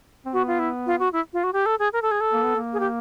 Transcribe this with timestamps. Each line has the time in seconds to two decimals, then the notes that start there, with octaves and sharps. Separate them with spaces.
0.25 C4
0.33 B3 F#4
0.47 F4
0.59 E4
0.86 F4
0.99 F#4
1.13 E4
1.33 F4
1.44 F#4
1.53 G4
1.66 A4
1.79 G#4
1.93 A#4
2.02 A4
2.11 G#4
2.20 A4
2.33 A#3
2.44 B3
2.55 A#3
2.73 G#4
2.80 G4